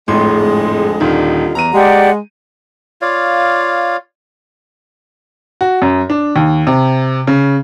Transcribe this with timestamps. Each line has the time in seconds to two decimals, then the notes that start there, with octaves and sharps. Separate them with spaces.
0.08 G#1 F2 A2 D3 G#3 C6
1.00 D#1 D3 D#3 D#4 F4
1.55 E2 A#5 D#7
1.73 G#3 G4 D5 F#5
3.01 F4 C#5 D5 F5
5.61 F#4
5.82 F#2
6.10 D4
6.36 D#2
6.67 C3
7.27 C#3